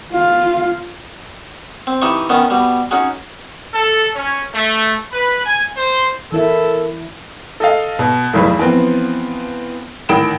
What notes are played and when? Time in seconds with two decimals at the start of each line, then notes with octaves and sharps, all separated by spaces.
0.13 F4 F5
1.87 C4
2.01 E3 D#4 E4 G4 D#5 C#6
2.30 D#3 B3 C#4 D#4
2.50 B2 G3
2.91 C#4 D#4 F#4 G#4
3.73 A4
4.15 C#4
4.54 A3
5.13 B4
5.46 G#5
5.77 C5
6.32 E3 E4 A4 A#4 E5
7.60 A4 D#5 F5
7.99 B2
8.33 F1 B1 E2 B4
8.58 E3 F3 B3 C4
10.09 A1 D#3 G5 B5 D7 E7